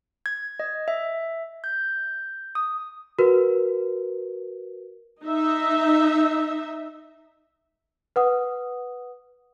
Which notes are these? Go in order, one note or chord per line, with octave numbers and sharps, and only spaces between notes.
G#6
D#5
E5
G6
D#6
F#4 A#4 B4
D#4 E5
B4 F#5 D#6